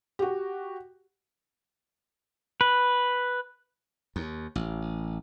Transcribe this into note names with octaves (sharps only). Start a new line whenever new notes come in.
F#4 G4
B4
D#2
A1